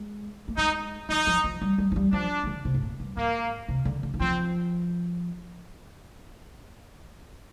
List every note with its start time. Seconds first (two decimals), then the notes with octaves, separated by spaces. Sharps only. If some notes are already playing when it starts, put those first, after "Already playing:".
Already playing: G#3
0.48 A#3
0.57 G#3 D#4
1.09 F3 D#4
1.27 F3
1.44 F3
1.62 G3
1.78 G3
1.92 F3
1.96 G3
2.12 F3 D4
2.44 D#3
2.47 D3
2.65 C3
2.74 G#2
2.83 A#2
3.00 G2
3.17 G#2 A#3
3.68 C3
3.85 D3
4.03 D3
4.14 D#3
4.20 F3 C4